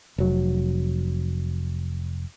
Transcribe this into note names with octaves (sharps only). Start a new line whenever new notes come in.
F1 F#3